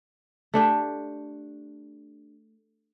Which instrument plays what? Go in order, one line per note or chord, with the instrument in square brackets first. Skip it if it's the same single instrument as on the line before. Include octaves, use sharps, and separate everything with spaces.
[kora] A3 D4 G4